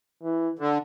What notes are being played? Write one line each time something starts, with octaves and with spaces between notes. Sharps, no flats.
E3
D3